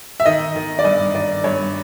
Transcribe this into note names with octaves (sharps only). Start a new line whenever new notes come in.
E5
D#3 D#5
D#3
D5
G2 D#5
D#3 D5
G2 C#5